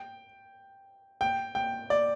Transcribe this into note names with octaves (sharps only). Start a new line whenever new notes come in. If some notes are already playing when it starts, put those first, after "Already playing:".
Already playing: G5
G5
G5
D5